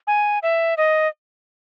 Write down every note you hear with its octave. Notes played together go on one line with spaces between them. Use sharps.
G#5
E5
D#5